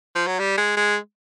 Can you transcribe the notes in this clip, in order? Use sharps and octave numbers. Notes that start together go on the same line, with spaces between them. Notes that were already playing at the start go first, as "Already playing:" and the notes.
F3
F#3
G3
G#3
G#3